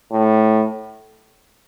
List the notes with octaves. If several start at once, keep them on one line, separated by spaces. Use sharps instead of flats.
A2